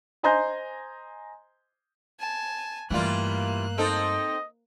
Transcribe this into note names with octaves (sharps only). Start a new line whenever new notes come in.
C5 D#5 G#5 A#5 C6 G6
G#5 A5
G2 E3 G3 A3 A#3 F4 F#6
C4 D#4 A4 D#5